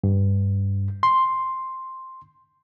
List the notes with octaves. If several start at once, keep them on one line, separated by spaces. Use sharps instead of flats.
G2
C6